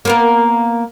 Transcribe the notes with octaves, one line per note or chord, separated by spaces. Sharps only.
A#3 B3 A#4